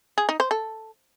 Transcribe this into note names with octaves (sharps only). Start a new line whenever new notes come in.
G#4
D#4
C5
A4